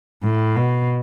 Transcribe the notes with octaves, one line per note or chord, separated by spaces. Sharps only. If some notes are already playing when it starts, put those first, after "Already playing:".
A2
B2